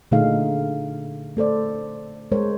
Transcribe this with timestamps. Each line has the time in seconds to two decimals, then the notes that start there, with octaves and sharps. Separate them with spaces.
0.11 A#2 D3 A3 D#4 G#4 F5
1.37 A3 A4 C5 D5
2.32 G#3 A#4 C5 C#5